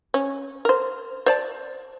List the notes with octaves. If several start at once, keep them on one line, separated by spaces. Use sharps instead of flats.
C#4
A#4 C5
C5 D5 A5